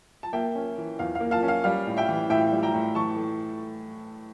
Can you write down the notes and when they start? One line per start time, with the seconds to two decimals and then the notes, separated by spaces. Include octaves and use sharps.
0.23 A5
0.33 A#3 E5 G5
0.55 C#4
0.78 E3
0.99 E2 F5
1.15 F5
1.20 A#3
1.31 F5 A5
1.43 C#4
1.48 F5
1.64 G3 F5
1.87 A2
1.97 E5 G5
2.09 E3
2.30 A2 E5 G5
2.52 G3
2.63 G5 A#5
2.74 A2
2.95 E3 A5 C#6
3.17 A3